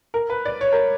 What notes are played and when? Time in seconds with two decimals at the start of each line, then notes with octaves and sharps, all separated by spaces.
0.14 A#4
0.30 B4
0.45 D5
0.61 C#5
0.72 A#4